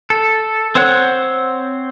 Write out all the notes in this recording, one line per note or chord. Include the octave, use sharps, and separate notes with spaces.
A4
C4 C5 C#5 F#5 F#6